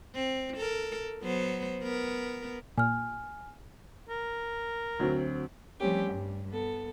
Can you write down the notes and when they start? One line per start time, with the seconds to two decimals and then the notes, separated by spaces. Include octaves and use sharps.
0.15 C4
0.57 A4 A#4
1.22 F#3 B3 C5
1.83 B3 A#4
2.78 A#2 G#5 F6
4.09 A#4
4.99 D2 F#3 C4
5.80 F3 G3 A3 C4 C#4 G4
6.08 G2
6.50 B3 A4